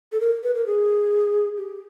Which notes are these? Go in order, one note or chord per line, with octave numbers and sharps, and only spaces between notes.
A4
A#4
B4
A#4
G#4
G4